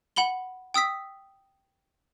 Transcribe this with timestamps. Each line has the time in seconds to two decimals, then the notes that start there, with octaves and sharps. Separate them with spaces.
0.16 F#5 B5 F#7 G7
0.74 G5 D#6 E6 B6